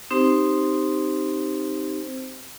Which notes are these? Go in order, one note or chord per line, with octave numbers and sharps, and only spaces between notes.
C4 D#4 G4 C5